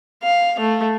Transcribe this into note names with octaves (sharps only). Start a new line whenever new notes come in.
F5
A3